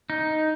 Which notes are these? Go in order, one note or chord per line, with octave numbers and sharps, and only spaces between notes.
D#4